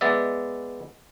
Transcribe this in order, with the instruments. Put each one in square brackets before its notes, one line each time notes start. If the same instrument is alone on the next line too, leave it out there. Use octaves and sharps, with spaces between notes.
[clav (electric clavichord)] G#3 B3 D5 E5